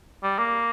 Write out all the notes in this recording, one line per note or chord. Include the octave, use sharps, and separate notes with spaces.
G3
A#3